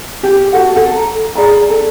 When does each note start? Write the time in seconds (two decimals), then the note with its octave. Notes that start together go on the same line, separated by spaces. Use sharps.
0.23 G4
0.53 F#4 A4 F#5
0.76 A4
0.95 A#5
1.35 G#4 D5 A#5 B5
1.70 A4